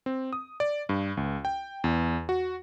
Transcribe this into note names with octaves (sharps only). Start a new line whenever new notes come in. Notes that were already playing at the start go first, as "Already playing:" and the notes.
C4
D#6
D5
G2
C#2
G5
E2
F#4